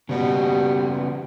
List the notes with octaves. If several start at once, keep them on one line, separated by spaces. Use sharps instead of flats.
C#3 G3 B3 F#4